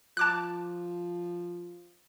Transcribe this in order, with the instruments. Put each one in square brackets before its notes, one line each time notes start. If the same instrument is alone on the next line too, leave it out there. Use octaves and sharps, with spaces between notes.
[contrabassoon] F3 [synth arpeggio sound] A5 D6 F#6